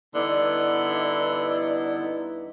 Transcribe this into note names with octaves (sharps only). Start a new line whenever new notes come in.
G2 D3 E3 B3 D#4 E4 D5